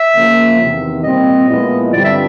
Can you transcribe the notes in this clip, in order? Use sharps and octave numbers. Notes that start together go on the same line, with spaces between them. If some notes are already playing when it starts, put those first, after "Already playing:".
Already playing: E5
C#3 F3 A#3
E2 C3 D#3
A#2 G3 C4 D#5
A#2 F3 G#3 B3 E4
G2 D3 G3 C4 F4 D5
E5